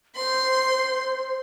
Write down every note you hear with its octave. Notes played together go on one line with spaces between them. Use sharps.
C5 C6